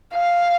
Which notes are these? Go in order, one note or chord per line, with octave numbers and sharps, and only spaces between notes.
F5